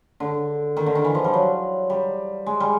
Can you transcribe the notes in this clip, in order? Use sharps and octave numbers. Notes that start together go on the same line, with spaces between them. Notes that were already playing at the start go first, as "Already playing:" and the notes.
D3
D#3
D3
D#3
E3
F3
G3
F#3
G3
G#3
G3